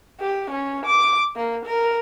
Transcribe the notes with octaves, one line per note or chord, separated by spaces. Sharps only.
G4
C#4
D6
A#3
A#4